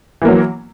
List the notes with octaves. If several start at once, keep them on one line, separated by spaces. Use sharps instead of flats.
E3 F#3 A#3